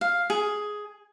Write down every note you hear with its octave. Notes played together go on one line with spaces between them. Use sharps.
F5
G#4